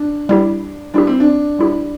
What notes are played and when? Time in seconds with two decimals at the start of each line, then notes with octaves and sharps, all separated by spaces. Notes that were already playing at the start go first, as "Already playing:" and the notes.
Already playing: D4
0.29 G3 E4 G4
0.94 G3 D4 E4 G4
1.07 C4
1.20 D4
1.59 G3 E4 G4